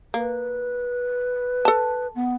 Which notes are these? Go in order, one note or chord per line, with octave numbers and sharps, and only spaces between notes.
A#3 B4
A4 A5
B3